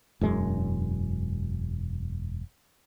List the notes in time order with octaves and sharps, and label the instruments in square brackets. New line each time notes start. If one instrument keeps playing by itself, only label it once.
[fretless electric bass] E1 F#2 G#3